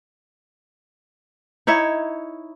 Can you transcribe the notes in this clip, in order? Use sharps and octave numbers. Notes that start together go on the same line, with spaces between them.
D#4 E4 C#5 E5